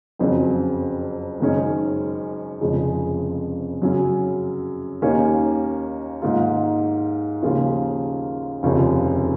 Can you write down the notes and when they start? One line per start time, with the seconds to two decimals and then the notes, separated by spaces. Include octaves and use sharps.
0.19 F#1 F2 C#3 F#3
1.40 F#1 F#2 D#3 G#3 C#4
2.61 F1 F2 C#3 F3 G#3
3.82 F#2 C#3 F#3 C#4
5.02 D#2 D#3 A#3 C#4
6.22 G#2 D#3 A#3 F4
7.42 D#2 C#3 F3 A#3 F4
8.63 F1 D#2 C#3 F3